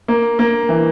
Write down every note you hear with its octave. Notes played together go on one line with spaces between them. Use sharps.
A#3
A#3
E3